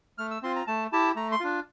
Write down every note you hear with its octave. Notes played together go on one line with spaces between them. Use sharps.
A3 F6
E6
C4 F4 C6
A#5
A3 A5
E4 G4 A5
A3 A#5
C6
D4 F4